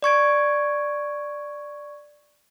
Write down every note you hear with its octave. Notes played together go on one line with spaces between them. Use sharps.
D5 C#6 G#6 D7